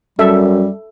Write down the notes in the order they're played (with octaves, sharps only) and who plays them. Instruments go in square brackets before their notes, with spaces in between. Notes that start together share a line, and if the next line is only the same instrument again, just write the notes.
[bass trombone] F#2 [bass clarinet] G3 [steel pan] A4 E5